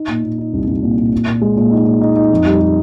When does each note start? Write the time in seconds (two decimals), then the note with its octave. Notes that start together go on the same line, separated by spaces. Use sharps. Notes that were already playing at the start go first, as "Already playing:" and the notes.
Already playing: D#4
0.09 A#2
0.23 A#2
0.38 D#4
0.53 C2
0.68 C2
0.82 A#2
0.98 A#2
1.12 A#2
1.27 A#2
1.41 G#3
1.57 A#2
1.71 D#4
1.87 A#2
2.01 D#4
2.16 D#4
2.31 F2
2.45 G3
2.60 G3